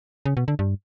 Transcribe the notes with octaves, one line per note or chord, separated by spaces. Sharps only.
C#3
B2
D3
G2